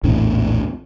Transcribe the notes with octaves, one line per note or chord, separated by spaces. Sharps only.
A#1 E2 A2 D4